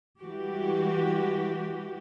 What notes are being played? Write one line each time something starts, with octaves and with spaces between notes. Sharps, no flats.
E3 G3 G#3 F#4 G4